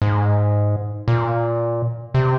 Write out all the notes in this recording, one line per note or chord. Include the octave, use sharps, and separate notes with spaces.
G#2
A#2
C3